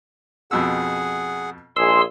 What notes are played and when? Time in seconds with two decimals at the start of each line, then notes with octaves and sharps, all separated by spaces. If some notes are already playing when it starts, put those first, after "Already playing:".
0.51 F2 B2 G#4 F#5 E6
1.76 A#1 G#2 G#4 C6 E6